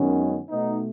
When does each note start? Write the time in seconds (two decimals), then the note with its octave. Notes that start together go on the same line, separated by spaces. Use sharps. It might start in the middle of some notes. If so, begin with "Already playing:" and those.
Already playing: F#2 D#3 G#3 B3 C#4
0.49 B2 A3 B3 D#4